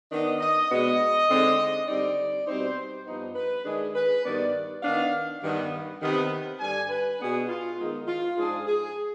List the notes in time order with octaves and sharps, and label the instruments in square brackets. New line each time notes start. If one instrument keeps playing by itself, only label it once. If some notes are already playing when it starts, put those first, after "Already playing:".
[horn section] D#3 B3 D4 D#5
D#5
B2 G#3 B3 D4 D#5
D3 G#3 C4 D#4
D3 G3 C4 D#4 D5
B2 G3 C4 D#4 C5
G2 F3 B3 D#4
B4
D#3 G#3 D4 G#4
B4
G2 D#3 B3 D4 D5
D#3 B3 D4 F5
G2 D#3 B3
C3 D#3 B3
G2 D3 G3 D4 G#5
B4
B2 B3 D4 G#4
F4
D#3 G#3 B3 D#4
F4
G#2 F3 G#3 D4 G#4
G#4